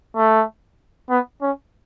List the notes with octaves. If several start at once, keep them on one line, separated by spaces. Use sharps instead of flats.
A3
B3
C#4